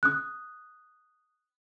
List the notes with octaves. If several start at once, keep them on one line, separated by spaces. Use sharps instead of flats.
D#6 F#6